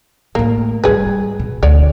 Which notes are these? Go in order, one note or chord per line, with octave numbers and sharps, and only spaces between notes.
A2 A3 A#3
G#2 G3 G#4 B4
B2
D2 C#5 D5